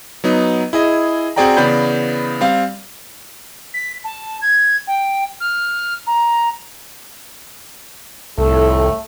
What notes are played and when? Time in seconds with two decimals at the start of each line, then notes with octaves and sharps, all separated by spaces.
0.24 F#3 B3 D#4
0.73 E4 G#4 D#5
1.36 C4 F#4 G#4 D5 G5 A#5
1.57 C#3 E3 B3 D5 B5 G6
2.41 G3 C4 F5
3.74 B6
4.04 A5
4.42 G#6
4.87 G5
5.41 F6
6.07 A#5
8.38 C2 F2 A2 A3 A4